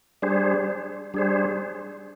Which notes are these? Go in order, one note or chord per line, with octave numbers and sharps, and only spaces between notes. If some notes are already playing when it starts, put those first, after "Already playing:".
G3 D4 G#4 C5
G3 D4 G#4 C5